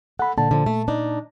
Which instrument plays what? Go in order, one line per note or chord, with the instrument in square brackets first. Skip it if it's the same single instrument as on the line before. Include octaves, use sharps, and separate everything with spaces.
[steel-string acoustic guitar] A4 [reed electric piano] F#5 B5
[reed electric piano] A#2 A5 [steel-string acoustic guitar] D3
[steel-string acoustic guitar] D3 F3
A3
D4 D#4